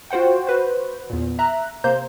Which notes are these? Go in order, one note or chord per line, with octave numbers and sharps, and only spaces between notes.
F4 F#4 C5 F#5 G5
F#4 B4 C5
E2 A#2
E5 A#5 F#6
C3 A#3 C5 A#5 G6